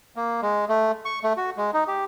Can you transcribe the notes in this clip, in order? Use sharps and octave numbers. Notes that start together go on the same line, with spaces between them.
A#3
G#3
A3
C#6
A3
F#4
G#3
D#4
G4